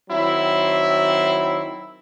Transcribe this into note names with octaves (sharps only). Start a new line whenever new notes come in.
D#3 F#3 C4 E4